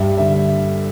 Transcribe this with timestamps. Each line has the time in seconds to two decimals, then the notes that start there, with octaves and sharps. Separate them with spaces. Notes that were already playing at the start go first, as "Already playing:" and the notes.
Already playing: G2 E5
0.17 D3 E5